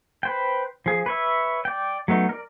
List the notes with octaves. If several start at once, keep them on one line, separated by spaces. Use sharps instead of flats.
B4 C5 G5
F3 G#4
B4 C#5 E5
D5 G5
F#3 A3 B3 D#4
A#4 D5